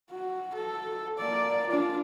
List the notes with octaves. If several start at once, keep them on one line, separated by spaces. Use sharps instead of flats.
F#4
A4
A#3 D5
D4 F4